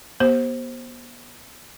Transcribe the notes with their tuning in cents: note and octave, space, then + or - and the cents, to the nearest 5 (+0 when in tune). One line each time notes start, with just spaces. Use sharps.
B3 -35 G4 +0 C5 +15